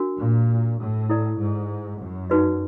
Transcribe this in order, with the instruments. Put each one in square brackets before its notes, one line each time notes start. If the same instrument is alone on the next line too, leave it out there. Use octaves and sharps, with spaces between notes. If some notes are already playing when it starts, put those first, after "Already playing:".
Already playing: [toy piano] D4 F#4 A#4
[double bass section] A#2
A2
[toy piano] E4 A4 D5
[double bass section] G#2
F#2
[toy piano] D#4 F#4 B4 D5